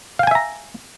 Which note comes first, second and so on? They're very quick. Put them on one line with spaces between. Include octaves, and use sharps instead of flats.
F5 G5 G#5 E5 A#5